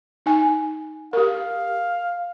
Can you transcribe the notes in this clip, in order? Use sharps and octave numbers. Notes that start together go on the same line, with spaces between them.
D#4 G#5
G4 A#4 F5